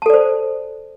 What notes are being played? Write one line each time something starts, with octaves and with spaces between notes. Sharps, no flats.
A4 C5 D5 A5